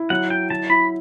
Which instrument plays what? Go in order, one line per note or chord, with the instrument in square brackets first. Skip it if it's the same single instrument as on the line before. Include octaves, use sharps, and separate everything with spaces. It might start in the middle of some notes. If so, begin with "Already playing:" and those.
Already playing: [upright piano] E4
[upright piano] F#3 [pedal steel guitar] F#5
[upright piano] E4 [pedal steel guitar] G5
[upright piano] F#3 [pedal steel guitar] A5
[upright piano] E4 [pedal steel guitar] B5